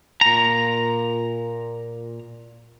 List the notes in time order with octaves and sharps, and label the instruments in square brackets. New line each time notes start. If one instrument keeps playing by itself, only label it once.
[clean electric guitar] A#2 A#5